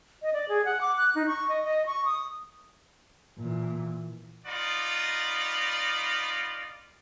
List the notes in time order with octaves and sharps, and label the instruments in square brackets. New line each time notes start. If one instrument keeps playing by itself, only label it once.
[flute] D#5
D5
G#4
F#5
D6
F#6
D#4
C#6
D#5
D#5
C#6
D#6
[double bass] A#2 E3
[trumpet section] B3 D#4 F4 D5